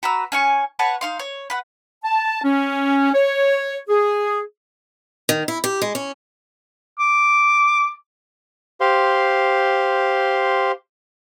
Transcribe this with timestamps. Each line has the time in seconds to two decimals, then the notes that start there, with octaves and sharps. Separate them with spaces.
0.03 F#4 B4 A#5 E6
0.32 C#4 G#5 C#6
0.79 B4 C#5 F#5 A5
1.01 D#4 F5 C6
1.19 C#5
1.50 B4 F#5
2.05 A5
2.44 C#4
3.15 C#5
3.89 G#4
5.29 D#3
5.48 E4
5.64 G4
5.82 G#3
5.95 C#4
7.00 D6
8.81 G4 C5 F5 C6